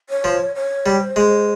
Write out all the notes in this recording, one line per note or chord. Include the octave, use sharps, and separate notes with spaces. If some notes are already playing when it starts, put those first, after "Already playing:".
C#5
F3
C#5
G3
C5
G#3